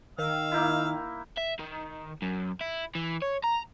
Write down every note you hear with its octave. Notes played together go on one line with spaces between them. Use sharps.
D#3 F5 E6
A#3 D#4 E4
E5
D#3
F#2
E4
E3
C#5
A#5